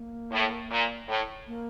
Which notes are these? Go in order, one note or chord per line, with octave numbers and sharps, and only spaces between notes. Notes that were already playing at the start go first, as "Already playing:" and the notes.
Already playing: A#3
A2
A#2
A2
A#3